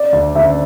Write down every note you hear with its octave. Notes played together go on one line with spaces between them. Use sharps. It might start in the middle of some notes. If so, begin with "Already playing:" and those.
Already playing: D5
D2
D2 E5